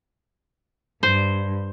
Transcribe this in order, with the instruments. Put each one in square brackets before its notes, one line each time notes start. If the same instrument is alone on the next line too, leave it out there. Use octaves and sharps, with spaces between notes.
[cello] G2 [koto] C5